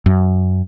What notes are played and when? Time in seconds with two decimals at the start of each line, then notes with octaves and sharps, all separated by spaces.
0.06 F#2